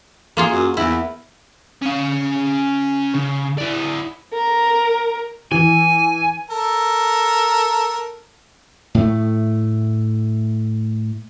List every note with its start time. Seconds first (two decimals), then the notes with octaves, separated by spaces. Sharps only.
0.37 A#3 F4 G#4
0.51 F#2
0.77 E2 E4
1.82 C#4 F5
3.15 C#3
3.58 E4 D5
4.33 A#4
5.52 E3 G#5
6.50 A4 A#4
8.95 A2 A3